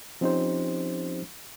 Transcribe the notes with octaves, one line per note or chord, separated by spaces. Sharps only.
F3 C4 C#4 D#4 G4 C5